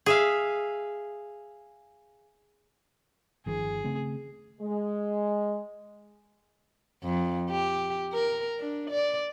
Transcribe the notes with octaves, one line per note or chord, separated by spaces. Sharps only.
G#4 E5 F5
G1 D#3 F3 G#4
C#3 A3 C4
G#3
F2
G4
A#4
D4
D5